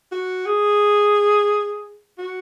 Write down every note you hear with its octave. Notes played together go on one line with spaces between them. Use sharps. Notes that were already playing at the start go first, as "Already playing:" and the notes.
F#4
G#4
F#4